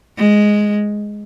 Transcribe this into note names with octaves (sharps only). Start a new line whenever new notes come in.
G#3